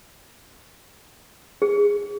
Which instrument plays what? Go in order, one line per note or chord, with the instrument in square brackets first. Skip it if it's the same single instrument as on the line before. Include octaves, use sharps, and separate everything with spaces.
[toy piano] G#4